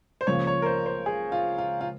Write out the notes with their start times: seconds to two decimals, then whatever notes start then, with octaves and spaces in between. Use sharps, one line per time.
0.21 C5
0.27 C#2 C#3 F3 A#3 C#5
0.47 C#5
0.62 A#4
0.66 C5
0.86 C5
1.06 G#4
1.32 F4
1.58 F4
1.81 F4